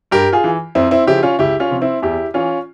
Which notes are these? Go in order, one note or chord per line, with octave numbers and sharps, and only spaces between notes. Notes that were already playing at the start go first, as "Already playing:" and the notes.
G2 G4 A#4
F4 G#4
E3
F2 C4 E4
C4 E4
C#3 F3 E4 G4
C#4 F4
C#2 E4 G4
C#4 F4
C3 F3
C4 E4
E2 E4 G4
E3 C#4 F4